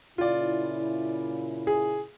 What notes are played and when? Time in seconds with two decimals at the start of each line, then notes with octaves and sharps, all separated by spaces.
0.18 A#2 C#3 E4 F4 D5
1.67 G#4